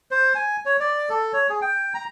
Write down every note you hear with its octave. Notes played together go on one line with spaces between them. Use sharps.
C5
G#5
C#5
D5
A4
C#5
G#4
G5
A#5